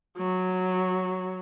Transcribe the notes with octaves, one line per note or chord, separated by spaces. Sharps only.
F#3